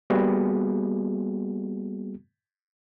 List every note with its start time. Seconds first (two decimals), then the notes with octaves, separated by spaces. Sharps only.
0.10 G3 A#3 B3 F#4 G#4